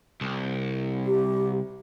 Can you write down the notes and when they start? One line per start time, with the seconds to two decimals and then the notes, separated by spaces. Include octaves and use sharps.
0.21 C2
1.06 G4